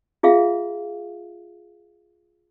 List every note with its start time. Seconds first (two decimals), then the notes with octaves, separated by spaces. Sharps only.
0.23 F4 G#4 E5 F5